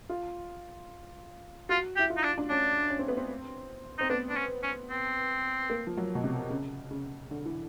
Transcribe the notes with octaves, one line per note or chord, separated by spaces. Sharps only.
F4
F4 F#4
E4 G4
F4
D#4
D4
D4
C#4 D4
C#4
C4
B3
C4
C4 D#4
B3 D4
D4
C#4
C#4
C4
A#3
F3
F#3
B2
C3
C#3
C#3
D3
E3